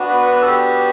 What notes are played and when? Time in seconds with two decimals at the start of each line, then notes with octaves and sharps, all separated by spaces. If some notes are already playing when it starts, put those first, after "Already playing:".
Already playing: B3 D4 F#4
0.09 B4
0.42 A4
0.47 G4